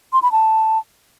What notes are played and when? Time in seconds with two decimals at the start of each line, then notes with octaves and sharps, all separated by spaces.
0.13 C6
0.22 B5
0.32 A5